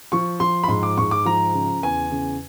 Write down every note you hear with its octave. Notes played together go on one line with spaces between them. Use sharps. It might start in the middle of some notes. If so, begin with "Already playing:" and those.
F3 C#6
F3 C6
B5
G#2 C6
D6
G#2 C#6
D6
F3 A#5
C#3
E2 G#5
C#3